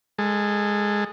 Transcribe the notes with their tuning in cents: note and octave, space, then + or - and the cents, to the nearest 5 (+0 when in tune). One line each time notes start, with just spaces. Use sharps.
G#3 -10 A4 +15